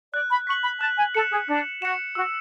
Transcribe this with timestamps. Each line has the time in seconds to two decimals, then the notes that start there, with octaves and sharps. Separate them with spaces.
0.14 D5 F#6
0.31 B5
0.47 C#6 B6
0.50 F#7
0.64 B5
0.81 A5 F#6
0.97 G#5
1.14 A4 C#7 E7
1.31 G#4
1.48 D4 F#6
1.82 F#4 C#7 E7
2.15 F#4 E6